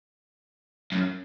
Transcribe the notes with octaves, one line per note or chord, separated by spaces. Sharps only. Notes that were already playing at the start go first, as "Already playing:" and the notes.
F#2